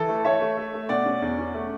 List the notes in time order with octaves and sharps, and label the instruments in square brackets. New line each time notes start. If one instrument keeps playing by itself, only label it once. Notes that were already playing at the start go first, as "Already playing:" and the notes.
Already playing: [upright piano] E3 A4
A3
A3 C#5 E5
A3
A3
A3
B2 D5 F#5
C#4
E2
C#4
A3